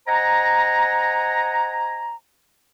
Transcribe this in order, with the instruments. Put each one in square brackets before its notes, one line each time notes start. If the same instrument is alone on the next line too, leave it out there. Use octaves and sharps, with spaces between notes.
[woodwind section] C5 D#5 F#5 G#5 A#5